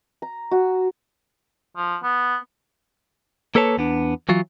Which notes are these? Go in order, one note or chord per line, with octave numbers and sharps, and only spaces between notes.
A#5
F#4
F3
B3
A#3 A4 B4 C#5 A5
E2 B3 D4
E3 F#3 F4